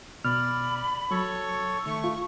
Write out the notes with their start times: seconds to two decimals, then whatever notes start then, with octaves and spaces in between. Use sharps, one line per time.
0.24 B2 D5 B5 F6
1.11 F#3 A4 C#5 C#6
1.86 D#3 A3 C#6
2.04 F4